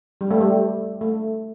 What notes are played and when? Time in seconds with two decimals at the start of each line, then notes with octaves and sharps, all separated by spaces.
0.21 G3
0.31 A3
0.41 G3
1.01 A3